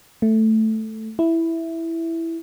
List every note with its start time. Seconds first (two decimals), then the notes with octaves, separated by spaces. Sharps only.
0.22 A3
1.19 E4